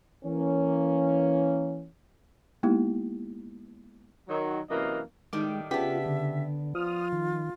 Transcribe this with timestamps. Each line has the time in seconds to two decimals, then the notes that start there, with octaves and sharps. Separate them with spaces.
0.24 E3 A#3 C#4
2.63 G#3 A#3 B3 D#4 E4 G4
4.28 D#3 F#3
4.70 F#2 C3 E3 A#3 D#5 F5
5.33 A2 D#3 G3 G#3 D6
5.71 C#3 B3 D4 F4 G4 E5 B6
6.06 D3
6.75 F3 F4 D#6 F6
7.12 D#3